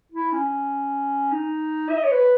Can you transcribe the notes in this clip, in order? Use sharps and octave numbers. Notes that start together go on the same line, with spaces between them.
E4
C#4
D#4
E5
D#5
C#5
B4